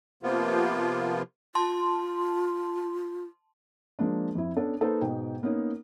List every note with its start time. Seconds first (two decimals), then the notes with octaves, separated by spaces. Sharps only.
0.23 C3 F3 A#3 B3 F4
1.55 F4 A5 C6
3.99 F3 G#3 A#3 D4
4.35 F2 E4
4.56 B3 C#4 D4 A4
4.81 A#3 D#4 A4 B4 C5
5.01 G#2 B2 G5
5.43 A#3 B3 C#4 D#4